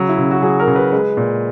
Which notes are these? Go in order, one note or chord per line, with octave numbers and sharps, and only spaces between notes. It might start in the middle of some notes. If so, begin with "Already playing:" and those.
Already playing: C#3 F#3
E4
C#3
F#4
F#3 G#4
A#4
C#3
B4
G#3
A#2